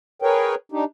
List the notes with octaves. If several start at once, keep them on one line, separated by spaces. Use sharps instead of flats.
G#4 A#4 B4 C#5 G5
D4 D#4 G4